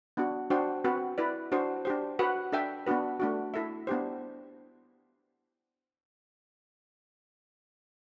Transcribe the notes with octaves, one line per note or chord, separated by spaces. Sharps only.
B3 D4 F#4
D4 F#4 C5 G5
C4 F#4 B4
E4 B4 D5
D4 F#4 C5
D4 G4 C5
F#4 B4 F#5
D4 A4 E5 G5
B3 D4 F#4 B4
A3 D4 F#4
E4 A4 E5
B3 D4 G4 C5